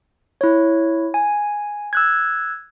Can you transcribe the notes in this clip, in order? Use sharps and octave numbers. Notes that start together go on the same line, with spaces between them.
E4 C#5
G#5
E6 F#6 G#6